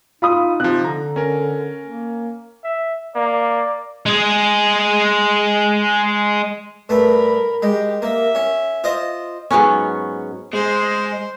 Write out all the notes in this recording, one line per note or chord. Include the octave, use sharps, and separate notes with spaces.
D#4 F4 B5 D#6
C3 F3 F#6
D3 A#5
C#4 A#4
A#3
E5
A#3 D5
G#3 G#4
G2 A3 A#4 B5
G#3 G4
A#3 E5
C#4
F4 C5 D#5
G#2 F#3 B3 C#4
G#3 C5